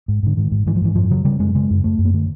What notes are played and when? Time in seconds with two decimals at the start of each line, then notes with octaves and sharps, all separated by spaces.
0.08 G#2
0.23 G#2 D3
0.37 G#2 D#3
0.51 G#2
0.67 G#2 E3
0.76 F3
0.82 G#2 E3
0.96 F#2 F3
1.11 C#3 F#3
1.25 C#3 G3
1.40 F#2 G#3
1.55 C#3 G#3
1.70 F#2
1.84 F#2 A3
1.99 F#2
2.05 A#3
2.14 D3 A3